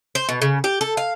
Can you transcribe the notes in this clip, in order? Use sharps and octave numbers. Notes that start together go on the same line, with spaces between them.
C5
B2
C#3
G4
A4
F5